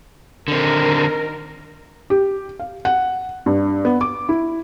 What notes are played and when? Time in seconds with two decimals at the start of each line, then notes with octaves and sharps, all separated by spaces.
0.48 D3 D#3 C4 A#4
2.10 G4
2.59 F5
2.85 F#5
3.46 G2
3.85 B3
4.01 D6
4.29 E4